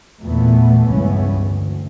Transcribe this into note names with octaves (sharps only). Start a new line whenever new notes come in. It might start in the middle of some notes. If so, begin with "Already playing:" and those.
E2 A#2 E3 A3 B3
C#2 G2 E3 B3 C#4
D2